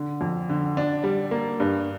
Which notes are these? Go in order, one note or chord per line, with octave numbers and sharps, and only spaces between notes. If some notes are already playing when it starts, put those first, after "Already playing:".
Already playing: D3
F2
D3
D4
G3
A#3
G2